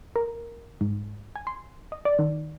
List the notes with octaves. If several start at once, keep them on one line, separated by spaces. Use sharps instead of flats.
A#4
G#2
G#5
C6
D#5
D5
D#3